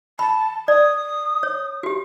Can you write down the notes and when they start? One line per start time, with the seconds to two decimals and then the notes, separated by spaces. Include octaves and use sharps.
0.19 A5 B5
0.68 D5 D#6
1.43 C#5
1.83 F#4 G4